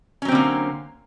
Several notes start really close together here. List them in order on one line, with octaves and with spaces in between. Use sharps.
C#4 F#3 C4 D3 A#3